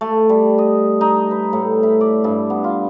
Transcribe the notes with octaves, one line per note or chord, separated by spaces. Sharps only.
A3
G3
D#5
D#4
B4
A2
E4
D5
G2
B3
F4